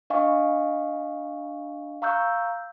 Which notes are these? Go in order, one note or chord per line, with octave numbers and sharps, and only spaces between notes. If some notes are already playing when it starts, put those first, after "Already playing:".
D4 D#5 F5 G#5 C#6
F5 A#5 C#6 E6 F#6 G6